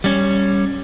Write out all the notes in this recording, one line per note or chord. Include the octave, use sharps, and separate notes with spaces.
G3 C#4